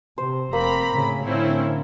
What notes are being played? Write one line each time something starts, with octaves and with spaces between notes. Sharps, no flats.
C3 C5
F1 A#3 C4 A#5 B5
A2 C#3
A2 D3 C4 C#4 E4